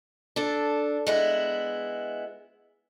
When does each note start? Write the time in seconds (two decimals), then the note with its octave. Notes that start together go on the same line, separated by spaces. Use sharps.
0.36 D4 A4
1.07 G#3 B3 E4